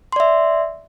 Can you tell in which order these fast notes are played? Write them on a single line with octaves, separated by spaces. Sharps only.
C6 D5 E5